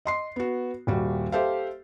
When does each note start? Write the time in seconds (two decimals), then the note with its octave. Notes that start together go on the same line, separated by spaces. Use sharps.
0.05 D#5 C6 C7
0.36 B3 F#4
0.87 D#1 G3 F#4
1.32 G4 A4 C5 E5 F5